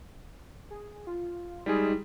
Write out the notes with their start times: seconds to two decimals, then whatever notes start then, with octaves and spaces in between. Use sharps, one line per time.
0.70 G#4
1.07 F4
1.66 G3 G#3 D#4 G#4